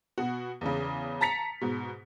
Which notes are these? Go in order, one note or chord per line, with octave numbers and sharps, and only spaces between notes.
B2 F#4
E2 C#3
A5 A#5 A6 B6 C#7 F7
G#2 B2